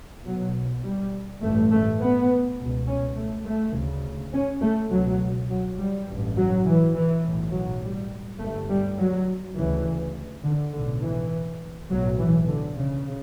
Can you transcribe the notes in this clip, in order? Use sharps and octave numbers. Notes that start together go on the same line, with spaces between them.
B1 B2 F#3
G3
A1 G2 A3
A3
B3
C#2 B2
C#4
A3
A3
D2 C#3
C#4
A3
C#2 B2 F#3
F#3
G3
A1 G2
F#3
E3
E3
B1 A2
F#3
G3
G1 G2 A3
G3
F#3
D2 C#3 E3
D3
B1 A2 D3
E3
B1 A2 F#3
E3
D3
C#3